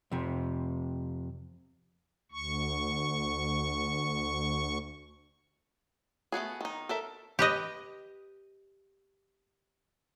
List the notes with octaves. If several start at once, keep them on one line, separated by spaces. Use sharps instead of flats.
F2 C3
D2 C#6
A3 B3 F#4 G#4
D#3 D#4
A4 A#4 E5
G4 B4 D#5